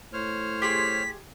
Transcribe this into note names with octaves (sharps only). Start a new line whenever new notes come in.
A2 C5 C#5 F6
G4 G#4 C6 B6